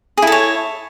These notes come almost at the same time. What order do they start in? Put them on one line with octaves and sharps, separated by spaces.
G#4 E4 A4 C#5